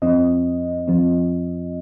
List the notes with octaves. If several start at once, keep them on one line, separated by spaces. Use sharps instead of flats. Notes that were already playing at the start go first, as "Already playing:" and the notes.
F2 F3 C4 D#5
F2 F3 C4